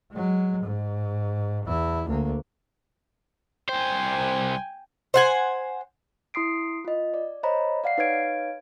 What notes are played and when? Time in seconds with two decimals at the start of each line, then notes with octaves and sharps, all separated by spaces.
0.12 F#3 G#3
0.63 G#2
1.65 E2 E4
2.08 D2 A#3
3.69 C2 C5 G5 G#5
5.14 C5 F#5 G#5
6.34 E4 C6 D#6 C7 D7
6.85 F4 D#5
7.14 D5
7.43 C5 C#5 D#5 A#5 B5
7.84 D5 F5 F#5 C7
7.98 D#4 B4 C#5 F5 G#6 D7